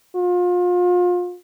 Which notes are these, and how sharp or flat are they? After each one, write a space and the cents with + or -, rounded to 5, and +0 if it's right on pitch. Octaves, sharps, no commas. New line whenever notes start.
F4 +35